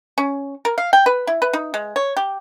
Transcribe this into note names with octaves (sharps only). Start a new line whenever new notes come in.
C#4
A#4
F5
G5
B4
E4
B4
D#4
G#3
C#5
G4